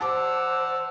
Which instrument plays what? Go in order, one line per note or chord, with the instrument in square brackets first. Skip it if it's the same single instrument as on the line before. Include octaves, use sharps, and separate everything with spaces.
[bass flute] C5 [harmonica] F#5 E6 [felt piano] A5 D6